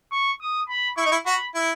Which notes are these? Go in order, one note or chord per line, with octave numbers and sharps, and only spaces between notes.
C#6
D#6
B5
E4 C#6
D#4
E4
F#4 B5
E4